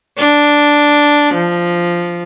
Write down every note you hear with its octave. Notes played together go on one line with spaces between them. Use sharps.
D4
F3